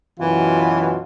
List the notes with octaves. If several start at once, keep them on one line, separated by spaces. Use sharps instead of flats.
F#2 B2 E3 F4